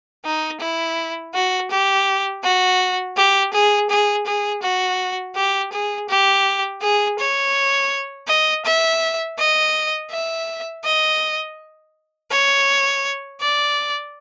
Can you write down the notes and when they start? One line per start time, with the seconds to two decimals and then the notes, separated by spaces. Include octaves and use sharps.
0.25 D#4
0.60 E4
1.34 F#4
1.71 G4
2.44 F#4
3.17 G4
3.53 G#4
3.90 G#4
4.26 G#4
4.62 F#4
5.36 G4
5.73 G#4
6.09 G4
6.82 G#4
7.19 C#5
8.28 D#5
8.65 E5
9.39 D#5
10.11 E5
10.84 D#5
12.31 C#5
13.41 D5